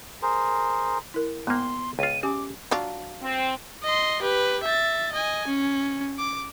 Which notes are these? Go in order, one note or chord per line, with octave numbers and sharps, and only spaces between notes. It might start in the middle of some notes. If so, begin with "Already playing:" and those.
G#4 A#4 C5
E4 A#4
G#2 A#3 B3 G5 C6
C#2 F4 D#7
C#4 G4 G#5 D6
F#3 D4 F4
C4
D#5 C6
G4 B4
E5 A6
D#5 G#5
C#4
D6